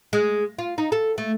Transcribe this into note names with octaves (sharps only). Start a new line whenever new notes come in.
G#3
F4
D#4
A4
A3